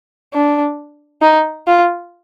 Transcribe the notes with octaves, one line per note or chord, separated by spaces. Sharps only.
D4
D#4
F4